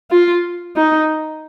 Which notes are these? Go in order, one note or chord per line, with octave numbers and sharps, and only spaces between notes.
F4
D#4